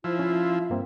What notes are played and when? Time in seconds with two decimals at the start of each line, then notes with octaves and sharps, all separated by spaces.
0.04 F3 E4 F4 C5
0.19 C#4 F4 E5
0.70 G2 A#3 C4